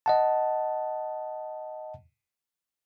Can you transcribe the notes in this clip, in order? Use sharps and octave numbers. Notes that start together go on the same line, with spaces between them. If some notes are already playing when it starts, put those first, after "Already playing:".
D#5 F#5 A5